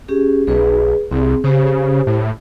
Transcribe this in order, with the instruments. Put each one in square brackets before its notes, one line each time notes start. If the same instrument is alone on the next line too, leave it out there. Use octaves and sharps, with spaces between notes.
[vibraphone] C#4 G4 G#4
[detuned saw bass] B1 [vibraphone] G#4 B4
[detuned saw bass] C2 [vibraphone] C4 G#4
[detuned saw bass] C#3 [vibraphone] G4 C5
[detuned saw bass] A2